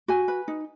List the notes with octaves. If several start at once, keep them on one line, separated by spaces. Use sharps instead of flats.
F#4 G#5
B4
D#4